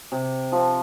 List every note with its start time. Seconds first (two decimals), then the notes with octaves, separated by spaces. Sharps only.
0.12 C3
0.52 F3 C4